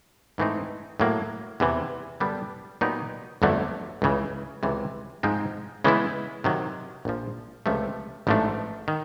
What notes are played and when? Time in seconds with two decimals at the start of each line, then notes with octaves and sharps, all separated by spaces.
0.38 G#2 E3 A3 C4 D#4
1.00 A2 F#3 A#3
1.60 E2 C3 E3
2.20 F#2 D3 G3 B3 D4
2.81 A#2 F#3 B3 D#4 G4
3.42 G1 F2 D3 F#3 A3
4.02 C#2 C#3 E3
4.63 C#2 C3 E3
5.23 G#2 F3 G#3 C4 D#4
5.84 C#3 E3 G#3 B3 E4
6.44 C3 D#3 F#3
7.05 A#1 A#2 F3
7.66 C#2 C3 F3 A3
8.27 A1 G#2 F3 A3 D4
8.88 D#3